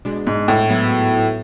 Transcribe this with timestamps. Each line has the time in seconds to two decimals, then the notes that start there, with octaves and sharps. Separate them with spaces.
0.05 B2 G#3 D4
0.27 G#2
0.48 A2
0.69 G#2 F#3 B3 E4